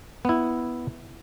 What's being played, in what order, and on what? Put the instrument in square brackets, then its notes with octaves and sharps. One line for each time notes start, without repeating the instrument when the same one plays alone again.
[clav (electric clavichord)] B3 E4